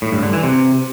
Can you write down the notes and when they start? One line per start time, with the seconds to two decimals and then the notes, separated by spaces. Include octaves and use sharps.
0.02 A2
0.12 G2
0.23 D3
0.33 E3
0.43 C3